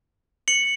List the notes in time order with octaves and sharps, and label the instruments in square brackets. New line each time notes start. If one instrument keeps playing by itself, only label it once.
[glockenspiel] C#7 F#7